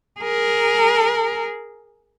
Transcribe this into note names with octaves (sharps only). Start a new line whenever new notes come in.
G#4 A#4